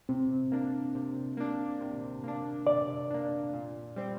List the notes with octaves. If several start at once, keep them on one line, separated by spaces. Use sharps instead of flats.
C3 C4
A#3 D4
C3
A#3 D4
C3
A#3 D4
C3 D5
A#3 D4
A#2
G3 C4